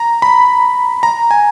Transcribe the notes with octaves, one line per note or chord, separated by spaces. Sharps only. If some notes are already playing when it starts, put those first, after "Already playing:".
Already playing: A#5
B5
A#5
G#5